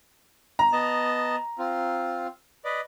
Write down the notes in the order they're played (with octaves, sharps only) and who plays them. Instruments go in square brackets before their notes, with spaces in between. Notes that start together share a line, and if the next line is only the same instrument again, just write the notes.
[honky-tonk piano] A#5
[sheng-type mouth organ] B3 D#5 A5
C4 F4
B4 D5 D#5